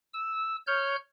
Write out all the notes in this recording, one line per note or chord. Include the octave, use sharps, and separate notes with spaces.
E6
C#5 F6 G6